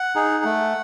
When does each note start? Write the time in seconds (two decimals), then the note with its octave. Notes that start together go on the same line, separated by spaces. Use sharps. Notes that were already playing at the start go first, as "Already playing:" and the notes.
Already playing: F#5
0.15 D#4 G#4
0.44 A3